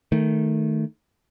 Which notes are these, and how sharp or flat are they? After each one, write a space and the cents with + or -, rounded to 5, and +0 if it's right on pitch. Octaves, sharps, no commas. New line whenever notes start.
D#3 +0 A3 +0